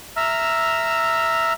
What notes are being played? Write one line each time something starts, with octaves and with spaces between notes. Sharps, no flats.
E5 A#5 E6 F6